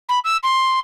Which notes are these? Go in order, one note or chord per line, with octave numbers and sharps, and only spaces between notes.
B5
E6
C6